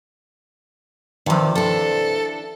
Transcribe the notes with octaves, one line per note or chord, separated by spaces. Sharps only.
G2 C3 D#3 F3
D4 E4 A4